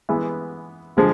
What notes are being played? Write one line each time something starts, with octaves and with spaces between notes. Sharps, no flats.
E3 G#3 B3
D3 F3 G#3